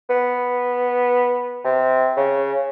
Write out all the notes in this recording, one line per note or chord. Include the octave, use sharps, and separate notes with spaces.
B3
C3
C#3